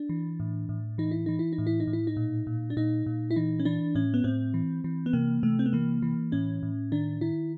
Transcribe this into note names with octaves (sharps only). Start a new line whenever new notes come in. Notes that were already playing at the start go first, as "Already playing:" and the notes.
Already playing: D4
E3
A2
A2
E3 D#4
E4
E3 D#4
E4
D#4
A2
E4
D#4
A2
E4
D#4
A#2
A#2
D4
A#2 D#4
A#2
E4
E3 D#4
C#4
E3 D4
A2 C#4
B3
A2 C4
E3
E3
B3
C3 A#3
C3 A3
C4
B3
E3 A#3
E3
A2 C#4
A2
D#3 D4
D#3 E4